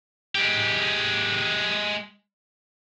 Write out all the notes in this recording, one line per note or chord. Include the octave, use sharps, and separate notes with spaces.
G#3 G4